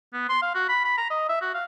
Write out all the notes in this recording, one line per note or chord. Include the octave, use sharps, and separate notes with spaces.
B3
C6
F5
F#4
B5
B5
A#5
D#5
E5
F#4
F5